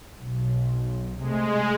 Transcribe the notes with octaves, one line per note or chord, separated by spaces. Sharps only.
B1
C3 G#3 A3